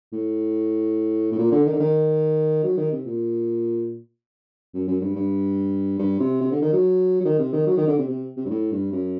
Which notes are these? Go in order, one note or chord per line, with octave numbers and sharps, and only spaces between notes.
A2
A2
A#2
D3
D#3
D3
D#3
F#3
D#3
C3
A#2
F#2
F#2
G2
G2
G2
C3
C3
D3
D#3
F#3
F#3
D#3
C3
D#3
F#3
D#3
D3
C3
C3
C3
G2
A2
G2
F#2